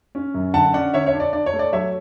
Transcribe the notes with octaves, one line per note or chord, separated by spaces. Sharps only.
C#4
F#2
D3 F#5 A5
C#4 D5 F#5
D3 C#5 E5
C#5 E5
D4
D5
D4 D5
C#5
A3
D5
F#3 C#5 E5